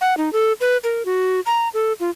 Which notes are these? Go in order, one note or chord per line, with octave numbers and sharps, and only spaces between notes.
F#5
D#4
A4
B4
A#4
F#4
A#5
A4
F4